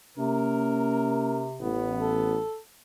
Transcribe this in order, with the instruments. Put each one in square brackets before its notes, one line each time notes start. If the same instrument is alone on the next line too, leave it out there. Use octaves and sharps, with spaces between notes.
[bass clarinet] C3 [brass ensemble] A#3 C#4 A#4
[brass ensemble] A1 B3
[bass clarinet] A4